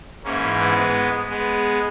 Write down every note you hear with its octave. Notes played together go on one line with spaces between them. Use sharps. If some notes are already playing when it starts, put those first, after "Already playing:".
G#2 E3 A#3 C#4
G#3 B3
G#3 B3